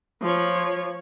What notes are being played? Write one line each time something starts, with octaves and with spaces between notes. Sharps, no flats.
F3 C#5